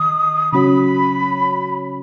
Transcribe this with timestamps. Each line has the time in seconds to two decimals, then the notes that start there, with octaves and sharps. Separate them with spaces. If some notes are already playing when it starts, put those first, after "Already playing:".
Already playing: D#3 D#5 D#6
0.52 C#3 F#3 C#4 F#4 C#5 B5